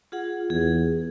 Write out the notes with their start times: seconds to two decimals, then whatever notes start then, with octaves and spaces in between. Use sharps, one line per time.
0.12 F4 G#4 F#5
0.50 E2 G#4